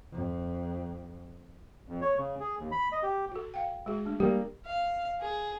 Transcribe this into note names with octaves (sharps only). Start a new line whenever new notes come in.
F2
F2
C#5
C#3
G#4
D#2
B5
D#5
G4
F#4 A4
F5 G5
G#3 F#4 G#4
A3 D4
G3 A#3 G4
F5
G#4